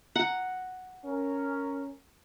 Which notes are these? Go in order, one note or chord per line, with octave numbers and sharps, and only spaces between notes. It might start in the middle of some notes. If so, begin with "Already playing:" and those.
F#5 A#5
C#4 A#4